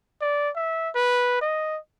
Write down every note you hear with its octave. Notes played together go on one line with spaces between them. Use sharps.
D5
E5
B4
D#5